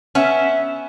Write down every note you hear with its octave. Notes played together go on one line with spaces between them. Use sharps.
B3 C#4 E5